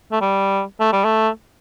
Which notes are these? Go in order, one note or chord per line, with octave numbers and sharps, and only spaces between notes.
A3
G3
A3
G3
A3